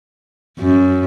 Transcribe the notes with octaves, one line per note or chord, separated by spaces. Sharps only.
F#2